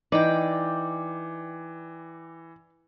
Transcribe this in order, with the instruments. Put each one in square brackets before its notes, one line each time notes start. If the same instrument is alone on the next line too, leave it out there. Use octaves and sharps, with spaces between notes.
[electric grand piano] E3 [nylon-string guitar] D#4 [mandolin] D5 G5 [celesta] D6